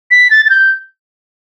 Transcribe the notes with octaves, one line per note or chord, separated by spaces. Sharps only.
B6
A6
A6
G6